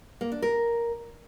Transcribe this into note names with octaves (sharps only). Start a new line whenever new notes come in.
A#3
D4
A#4